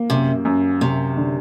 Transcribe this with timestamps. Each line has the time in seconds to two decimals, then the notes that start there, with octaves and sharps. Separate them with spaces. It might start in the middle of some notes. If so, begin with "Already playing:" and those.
Already playing: A#3
0.10 F#2 C3
0.45 F#2
0.81 F#2 C3
1.17 D3